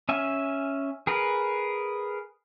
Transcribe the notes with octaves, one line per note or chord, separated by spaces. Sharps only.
C#4 E5 G#5
G#4 A#4 B4